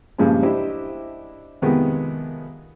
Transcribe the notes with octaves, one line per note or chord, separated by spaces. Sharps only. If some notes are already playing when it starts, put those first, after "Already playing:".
G2 A#2 C#3 F3 G#3
D4 E4 G4 C5 D#5
F2 C3 D#3 G#3 B3